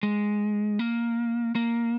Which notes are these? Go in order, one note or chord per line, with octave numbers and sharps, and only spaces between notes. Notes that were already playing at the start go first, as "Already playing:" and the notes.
G#3
A#3
A#3